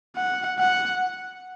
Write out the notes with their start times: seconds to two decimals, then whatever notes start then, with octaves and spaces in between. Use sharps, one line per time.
0.17 F#5
0.59 F#5